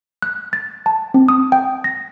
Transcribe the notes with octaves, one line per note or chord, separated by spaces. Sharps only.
F#6
A6
A5
C4
D#6
G5
A#6